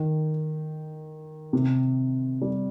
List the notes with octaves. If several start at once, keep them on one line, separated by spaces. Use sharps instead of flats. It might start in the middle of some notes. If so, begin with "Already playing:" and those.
Already playing: D#3
C3
G3